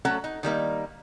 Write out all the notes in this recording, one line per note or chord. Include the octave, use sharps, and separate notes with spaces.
F#3 A3 C#4 A4 F#5 A#5
D#4
D#3 G3 A#3 D#4